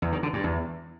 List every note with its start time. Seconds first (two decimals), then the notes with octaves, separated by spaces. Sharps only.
0.02 E2
0.12 D#3
0.23 D3
0.33 G2
0.44 E2